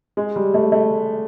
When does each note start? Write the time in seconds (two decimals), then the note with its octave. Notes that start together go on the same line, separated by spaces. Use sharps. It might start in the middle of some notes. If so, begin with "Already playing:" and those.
0.17 G#3
0.36 G3
0.54 A3
0.72 A3